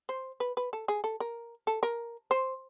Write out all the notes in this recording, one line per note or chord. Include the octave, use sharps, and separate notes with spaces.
C5
B4
B4
A4
G#4
A4
A#4
A4
A#4
C5